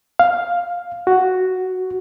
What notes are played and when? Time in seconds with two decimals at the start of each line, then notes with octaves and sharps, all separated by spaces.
0.19 F5
1.07 F#4